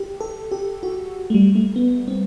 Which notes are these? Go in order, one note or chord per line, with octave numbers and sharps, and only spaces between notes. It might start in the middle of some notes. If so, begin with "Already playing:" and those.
Already playing: G4
A4
G4
F#4
A3
G3
A3
B3
C4